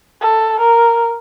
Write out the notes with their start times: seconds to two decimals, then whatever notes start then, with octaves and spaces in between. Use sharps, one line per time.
0.22 A4
0.60 A#4